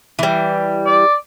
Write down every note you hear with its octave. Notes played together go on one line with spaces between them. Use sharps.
E3 G3
D5